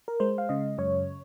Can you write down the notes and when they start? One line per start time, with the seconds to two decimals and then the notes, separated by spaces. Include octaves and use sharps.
0.08 A#4
0.20 G#3 C5
0.38 F5
0.49 C#3 D#5
0.78 F#2 C#5